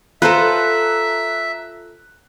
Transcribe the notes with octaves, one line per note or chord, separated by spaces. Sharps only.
F4 A4 B4 C5 E5 A#5 F#6